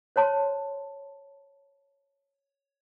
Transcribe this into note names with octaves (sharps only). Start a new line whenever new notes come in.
C5 C#5 A5 C6